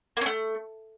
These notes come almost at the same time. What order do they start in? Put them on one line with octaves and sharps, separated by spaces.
A#3 C#4 A3